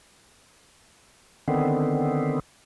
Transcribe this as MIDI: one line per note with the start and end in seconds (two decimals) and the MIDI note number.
1.48 2.39 50
1.48 2.39 51
1.48 2.39 59
1.48 2.39 60